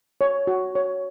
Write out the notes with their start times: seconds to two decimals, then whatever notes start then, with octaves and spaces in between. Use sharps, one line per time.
0.21 C#5
0.47 F#4
0.75 C#5